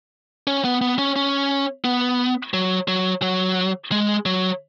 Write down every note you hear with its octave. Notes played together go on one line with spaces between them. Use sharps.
C#4
B3
B3
C#4
C#4
B3
F#3
F#3
F#3
G#3
F#3